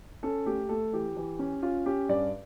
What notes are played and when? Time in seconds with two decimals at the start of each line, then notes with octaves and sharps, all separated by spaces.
0.23 C#4 A4
0.46 A3 G4
0.69 A3 A4
0.93 E3 G4
1.17 E3
1.39 C#4
1.62 C#4 F4
1.86 C#4 G4
2.09 G2 D5